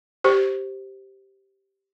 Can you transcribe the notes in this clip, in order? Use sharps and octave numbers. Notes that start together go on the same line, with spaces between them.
G4 C5